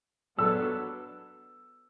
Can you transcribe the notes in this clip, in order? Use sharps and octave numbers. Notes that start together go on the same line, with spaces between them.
F#3 B3 D4 A4 E6